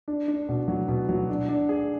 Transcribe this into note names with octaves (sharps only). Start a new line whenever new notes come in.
D4
D4
B2
F#3
B2
F#3
D4
D4
G#4